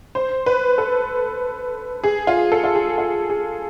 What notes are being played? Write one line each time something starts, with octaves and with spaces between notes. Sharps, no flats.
C5
B4
A4
G#4
F4
A4
F4
G#4
F4
G#4